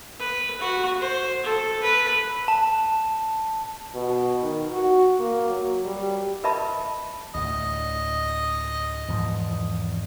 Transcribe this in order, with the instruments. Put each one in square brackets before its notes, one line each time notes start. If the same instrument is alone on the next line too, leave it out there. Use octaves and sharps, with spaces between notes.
[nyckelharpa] B4
F#4
C5
A4
B4
[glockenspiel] A5
[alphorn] B2
D#3
F#4
A#3
F#3
G3
[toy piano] A#4 B4 D#5 E5 A5 B5
[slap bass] D2 A2 [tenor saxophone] D#5
[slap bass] E2 G#2 F3